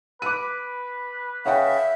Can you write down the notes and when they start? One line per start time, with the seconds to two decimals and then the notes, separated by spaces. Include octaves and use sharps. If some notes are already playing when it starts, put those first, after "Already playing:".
0.22 B4 D6 D#7
1.46 C#3 E5 F#5 G5